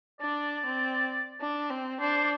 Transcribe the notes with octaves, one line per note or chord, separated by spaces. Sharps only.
D4 D5
C4
D4
C4
D4 C5